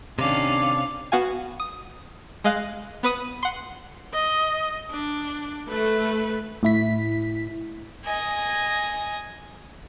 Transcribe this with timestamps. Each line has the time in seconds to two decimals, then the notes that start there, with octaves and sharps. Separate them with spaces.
0.19 C3 D#3 C#4 D4 F5 D6
1.12 B3 F#4 F5 G#5
1.60 D#6
2.44 G#3 D#5 F5 F#6
3.03 B3 B4 D#6 D#7
3.43 F#5 C6
4.13 D#5
4.90 D4
5.69 A3 B4
6.63 A2 E4 B6
8.05 D#5 G#5